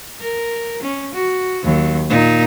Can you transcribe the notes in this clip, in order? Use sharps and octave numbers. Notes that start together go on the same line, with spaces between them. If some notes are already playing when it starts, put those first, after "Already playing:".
A#4
C#4
F#4
D#2 F#3
A#2 D#4